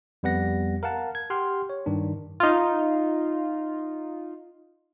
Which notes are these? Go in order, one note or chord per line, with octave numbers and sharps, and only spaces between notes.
F2 G3 B3 F#5 A#6
A#4 F5 F#5 A5
G#6
G4 F#5 G5 C6 F6
C#5
G2 D#3 D4
D#4 F4